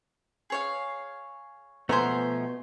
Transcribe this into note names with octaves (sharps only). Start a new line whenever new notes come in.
G#4 C#5 F5
B2 F3 A3 B3 C5 G#5 A#5